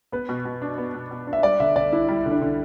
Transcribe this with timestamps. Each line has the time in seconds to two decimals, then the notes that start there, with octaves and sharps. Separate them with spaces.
0.12 B3 B4
0.29 B2
0.45 B2
0.62 D4
0.78 B3
0.95 B2
1.11 B2
1.27 D4
1.33 E5
1.43 G3 D5
1.60 D3 E5
1.76 D3 D5
1.92 D4 E4
2.09 G3 E4
2.26 D3
2.31 D4
2.42 D3